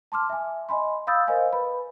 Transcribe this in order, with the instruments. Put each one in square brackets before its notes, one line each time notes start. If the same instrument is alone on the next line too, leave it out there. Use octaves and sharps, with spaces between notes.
[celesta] A5 C6 D6 F6
E5 G#5
D#5 G#5 B5 C6
F5 B5 D#6 E6 G6 A6
A#4 C5 D#5 F5 G#5
B4 B5